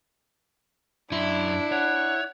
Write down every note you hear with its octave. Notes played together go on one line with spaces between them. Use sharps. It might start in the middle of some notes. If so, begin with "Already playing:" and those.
F#2 D4 E4 C6
C#5 F#5